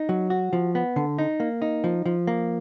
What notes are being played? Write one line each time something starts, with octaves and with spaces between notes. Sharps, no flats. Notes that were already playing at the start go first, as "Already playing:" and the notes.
Already playing: D#4
F#3
F#4
F3
B3
D3
D#4
A#3
D#4
F3
F3
A#3